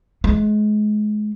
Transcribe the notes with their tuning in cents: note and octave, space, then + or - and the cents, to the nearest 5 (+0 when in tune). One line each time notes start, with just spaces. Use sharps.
G#3 +30